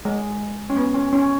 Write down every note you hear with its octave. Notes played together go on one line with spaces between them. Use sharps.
G#3
C#4
B3
C#4
C#4